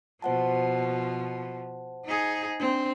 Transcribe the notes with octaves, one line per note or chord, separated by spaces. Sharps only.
B2 F3 C5 F#5 A5
D#4 G#4
C4 D4